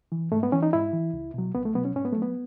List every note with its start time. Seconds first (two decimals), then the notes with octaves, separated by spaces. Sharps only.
0.12 E3
0.32 G#2 A3
0.43 B3
0.52 E3 C#4
0.63 D#4
0.73 G#2 E4
0.93 E3
1.13 C#2
1.34 B2 F#3
1.54 C#2 B3
1.65 A3
1.75 B2 F#3 B3
1.85 C#4
1.95 G#2 C#4
2.05 B3
2.13 A3
2.17 F#3
2.22 B3